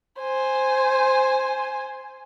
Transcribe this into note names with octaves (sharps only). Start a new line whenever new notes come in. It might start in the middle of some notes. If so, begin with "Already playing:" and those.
C5 G#5